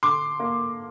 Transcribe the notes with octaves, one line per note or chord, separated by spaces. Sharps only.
D3 C6 D6
A#3